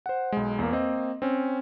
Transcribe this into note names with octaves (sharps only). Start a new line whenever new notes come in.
C5 F#5
B1 G#3
E2 A#3
A#3 C4 D#5
C4 C#4